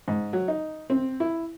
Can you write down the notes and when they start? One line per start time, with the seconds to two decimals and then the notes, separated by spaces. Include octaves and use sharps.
0.08 G#2
0.33 F#3
0.48 D#4
0.90 C4
1.20 E4